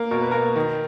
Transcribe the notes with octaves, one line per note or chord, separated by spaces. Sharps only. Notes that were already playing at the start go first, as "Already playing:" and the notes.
Already playing: A#3
B2 A#4
B4
A#3 A#4
D#3